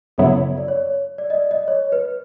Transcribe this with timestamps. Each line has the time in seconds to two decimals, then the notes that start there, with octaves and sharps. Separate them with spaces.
0.18 F#2 C#3 F#3 B3 E4 A4
0.58 D5
0.68 C#5
1.18 D5
1.30 D#5
1.34 D5
1.51 D#5
1.68 C#5
1.92 B4